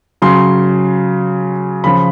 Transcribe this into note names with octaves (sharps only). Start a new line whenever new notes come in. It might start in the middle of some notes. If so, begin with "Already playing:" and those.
C#3 F#3 C6
C#3 F3 B5